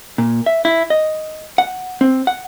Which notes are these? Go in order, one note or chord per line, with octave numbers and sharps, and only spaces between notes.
A#2
E5
E4
D#5
F#5
C4
F#5